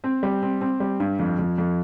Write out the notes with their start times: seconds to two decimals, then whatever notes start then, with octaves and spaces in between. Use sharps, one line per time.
0.04 C4
0.23 G3
0.42 C4
0.61 C4
0.80 G3
1.00 G2
1.19 F2
1.39 F2
1.58 F2